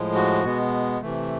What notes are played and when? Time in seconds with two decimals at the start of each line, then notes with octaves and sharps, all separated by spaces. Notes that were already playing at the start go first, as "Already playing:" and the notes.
Already playing: A2 F3 G#3
0.15 F#4
0.44 B2 G#3 B3
1.01 C3 E3 A3